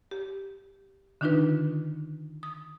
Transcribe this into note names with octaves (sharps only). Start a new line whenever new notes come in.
G4
D3 D#3 D4 D#4 F4 B4
D#6